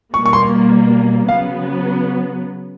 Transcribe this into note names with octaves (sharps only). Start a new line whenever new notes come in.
B2 G3 A#3 C#6
C#6
C6
C#3 F#3 B3 F5